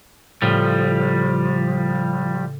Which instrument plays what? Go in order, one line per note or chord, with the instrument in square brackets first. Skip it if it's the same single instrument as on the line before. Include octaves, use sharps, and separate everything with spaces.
[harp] A2 C#3 [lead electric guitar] F3 G3